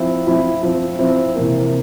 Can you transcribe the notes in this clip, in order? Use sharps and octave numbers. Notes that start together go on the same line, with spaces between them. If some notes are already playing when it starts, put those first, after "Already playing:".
Already playing: F3 C4 E4
F3 C4 E4
F3 C4 E4
F3 C4 E4
C3 E3 A#3